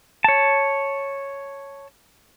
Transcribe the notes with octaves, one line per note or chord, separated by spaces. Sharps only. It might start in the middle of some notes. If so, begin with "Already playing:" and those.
C#5 A5